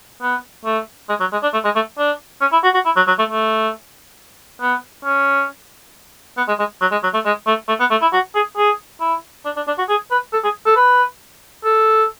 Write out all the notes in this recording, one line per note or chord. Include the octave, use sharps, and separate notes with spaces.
B3
A3
G#3
F#3
G#3
D4
A3
G#3
A3
D4
C#4
E4
F#4
F#4
E4
F#3
F#3
A3
A3
B3
C#4
B3
G#3
G#3
F#3
G#3
F#3
A3
G#3
A3
A3
B3
A3
E4
F#4
G#4
G#4
E4
D4
D4
D4
F#4
G#4
B4
A4
G#4
A4
B4
A4